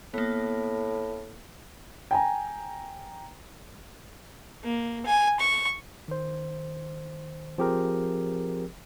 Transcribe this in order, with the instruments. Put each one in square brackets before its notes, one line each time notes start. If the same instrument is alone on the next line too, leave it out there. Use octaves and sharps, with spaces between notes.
[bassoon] A2 [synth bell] A#3 B3
[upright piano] G5 G#5 A#5
[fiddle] A#3
G#5
C#6
[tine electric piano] D#3 C5
F3 C4 G4 G#4 A#4